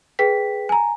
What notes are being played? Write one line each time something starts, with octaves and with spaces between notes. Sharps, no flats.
G#4 B4 G5 B6
G#5 A#5